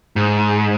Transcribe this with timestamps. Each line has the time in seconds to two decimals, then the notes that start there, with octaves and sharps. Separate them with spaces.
0.16 G#2